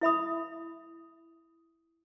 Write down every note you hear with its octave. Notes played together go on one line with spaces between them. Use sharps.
E4 E5 B5 D#6